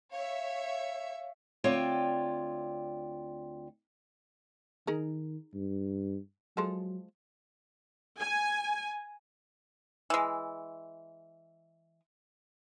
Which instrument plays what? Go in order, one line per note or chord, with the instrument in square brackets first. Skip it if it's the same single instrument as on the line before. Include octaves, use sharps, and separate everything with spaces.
[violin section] C#5 E5 [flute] F5
[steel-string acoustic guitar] D2 C4 F4 C#5 D5 G5
[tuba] D#3 [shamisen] D#4 G#4 A#4
[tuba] G2
[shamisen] F3 G#3 A4 [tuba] F#3
[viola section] G#5
[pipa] E3 G#3